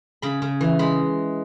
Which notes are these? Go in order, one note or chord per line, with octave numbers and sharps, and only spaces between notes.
C#3 B5
C#3
E3
G#3 B5